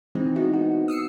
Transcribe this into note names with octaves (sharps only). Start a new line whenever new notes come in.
E3 G#3 C4 D#4
B3 D#4 E4 F#4
F#4
D#6 E6 C7 C#7